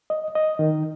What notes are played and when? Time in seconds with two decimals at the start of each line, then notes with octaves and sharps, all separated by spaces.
0.10 D#5
0.35 D#5
0.59 D#3